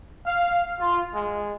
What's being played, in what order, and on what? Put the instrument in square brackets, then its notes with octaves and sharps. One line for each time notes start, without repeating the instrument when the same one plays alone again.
[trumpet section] F5
F4
G#3